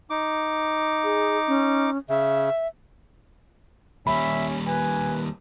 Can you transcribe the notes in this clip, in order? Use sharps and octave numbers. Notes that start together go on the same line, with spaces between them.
D#4 D6
G#4
C#4
C#3 E5
D#2 G3 C#4 E5 B5
B4 G#5